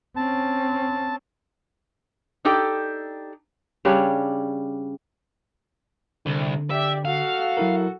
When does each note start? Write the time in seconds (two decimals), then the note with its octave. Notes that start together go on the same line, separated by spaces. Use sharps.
0.16 C4 C#4 A5
2.45 D4 D#4 G4 A4 G5
3.85 C#3 G3 D4 C#5
6.26 C2 D3
6.70 G4 D5 E5
7.05 F#4 A4 F5
7.57 F#3 E4 A#4